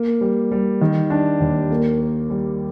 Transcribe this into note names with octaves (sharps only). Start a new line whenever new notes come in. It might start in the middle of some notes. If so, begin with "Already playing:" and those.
Already playing: A#3
G3
G3
D#3
D4
D#2
A#3
A#4
G3